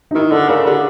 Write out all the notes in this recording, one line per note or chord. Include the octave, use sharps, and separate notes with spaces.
D#4
D#3 E4
D3 A4
C#3 A#4
D3 G#4